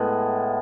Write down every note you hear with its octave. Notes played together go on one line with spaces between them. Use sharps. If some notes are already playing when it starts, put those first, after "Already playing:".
Already playing: A2 G#3 B3